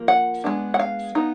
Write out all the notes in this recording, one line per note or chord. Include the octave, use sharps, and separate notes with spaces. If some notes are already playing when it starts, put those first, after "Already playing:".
Already playing: F3 A#3
F#5
G#3 B3 D4
F#5
F5
B3 D#4